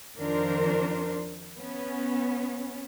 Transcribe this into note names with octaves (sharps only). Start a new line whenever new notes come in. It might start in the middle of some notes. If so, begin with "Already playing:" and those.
F2 D#3 F3 D4 A#4 C5
B3 C#4